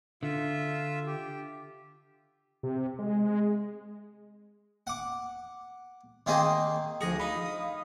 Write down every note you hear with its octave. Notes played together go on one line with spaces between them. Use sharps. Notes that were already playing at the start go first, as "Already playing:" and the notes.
D3 F4 E5
G4
C3
G#3
F#5 D6
D#3 A#3 C4 G#4 D#5
D2 F3 G#4 D#6 A#6 C#7
D#4 F5 B5